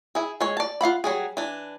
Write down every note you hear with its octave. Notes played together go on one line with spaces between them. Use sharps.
E4 G#4
G#3 C#5
D5 A5
F4 F5 F#5 B5
F#3 G3 G#4
E3 D4